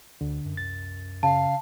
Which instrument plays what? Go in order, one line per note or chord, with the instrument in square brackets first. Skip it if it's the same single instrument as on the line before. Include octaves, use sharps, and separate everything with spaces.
[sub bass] D2 [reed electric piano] D3
[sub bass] F#2
[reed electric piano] C2 A6
[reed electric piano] C#3 [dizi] F5 [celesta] A5